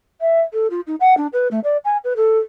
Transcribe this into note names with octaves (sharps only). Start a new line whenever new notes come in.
E5
A4
F4
D#4
F#5
D4
B4
A3
D5
G#5
B4
A4